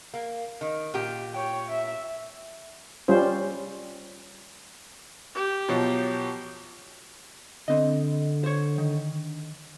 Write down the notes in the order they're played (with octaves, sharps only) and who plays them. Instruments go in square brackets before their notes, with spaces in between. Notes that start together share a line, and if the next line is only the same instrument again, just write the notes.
[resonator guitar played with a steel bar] A#3
D#3
A#2 G4
[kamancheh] C#5 G5
E5
[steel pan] G3 C#4 F4 C5
[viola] G4
[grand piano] B2 F3 F#3
[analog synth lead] D3 [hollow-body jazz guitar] C4 D#5
[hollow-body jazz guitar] C5 C#5
D#3